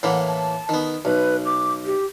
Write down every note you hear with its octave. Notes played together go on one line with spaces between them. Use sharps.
A2 E3 A#3 F#5
A5
D#3 B3
B1 B4
D6
G4